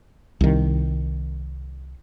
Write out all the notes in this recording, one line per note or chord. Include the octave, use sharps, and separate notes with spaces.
C2 D#3